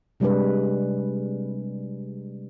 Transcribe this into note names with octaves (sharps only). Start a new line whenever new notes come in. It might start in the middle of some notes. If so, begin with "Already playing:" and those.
C3 G3 G#3 D4 B4